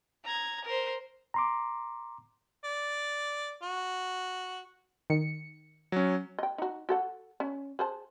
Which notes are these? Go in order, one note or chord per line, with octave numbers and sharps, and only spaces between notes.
A#5 G#6
A#4 C5
A#5 C6 D6
D5
F#4
D#3 C#7
F#3 C#4
D#5 G5
D#4 F#4
F#4 A4 F#5
C#4
G#4 C5 A5